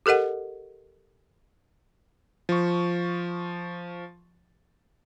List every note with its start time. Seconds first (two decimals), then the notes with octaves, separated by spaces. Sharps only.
0.06 G4 A4 A#4 D#5 F#5
2.49 F3 C#6